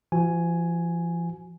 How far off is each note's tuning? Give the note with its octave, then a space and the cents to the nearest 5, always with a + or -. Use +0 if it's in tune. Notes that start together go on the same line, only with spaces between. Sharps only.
F3 -40 F#4 +0 G#5 +5